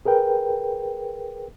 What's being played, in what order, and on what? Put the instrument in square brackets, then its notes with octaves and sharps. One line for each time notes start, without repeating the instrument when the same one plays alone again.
[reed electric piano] G#4 A#4 B4 G5